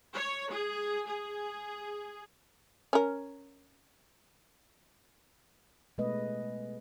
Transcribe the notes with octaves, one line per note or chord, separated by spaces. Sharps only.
C#5
G#4
G#4
C#4 A#4
B2 G#3 A3 B3 B4 D#5